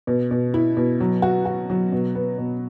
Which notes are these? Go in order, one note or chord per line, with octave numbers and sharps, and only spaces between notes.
B2
B2
E4
B2
F#3
F#4
F#4
F#3
B2
B3
B2